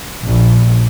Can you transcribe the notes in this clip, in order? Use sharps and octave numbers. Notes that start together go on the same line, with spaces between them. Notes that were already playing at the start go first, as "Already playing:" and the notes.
A#1